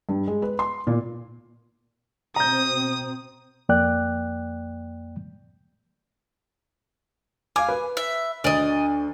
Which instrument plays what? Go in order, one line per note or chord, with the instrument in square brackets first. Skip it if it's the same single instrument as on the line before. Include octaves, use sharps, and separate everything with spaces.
[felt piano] G2
G#3
B4
C6
A#2
[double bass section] B2 C4 [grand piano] A#5 G6 [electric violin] D#6
[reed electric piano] F2 A#3 D5 G5 F#6
[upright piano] F5 D6 [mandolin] G#5
[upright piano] B4
[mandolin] E5
[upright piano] D2 D3 [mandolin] D5 D#5